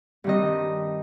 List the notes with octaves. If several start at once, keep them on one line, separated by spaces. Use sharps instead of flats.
G2 D#3 G3 C4 D#5